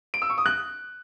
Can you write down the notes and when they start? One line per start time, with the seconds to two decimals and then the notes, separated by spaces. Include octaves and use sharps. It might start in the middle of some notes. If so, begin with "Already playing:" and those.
0.14 D7
0.22 E6
0.30 C#6
0.38 D#6
0.46 F#6